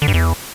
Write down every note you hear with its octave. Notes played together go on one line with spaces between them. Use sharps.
D3
G2
E2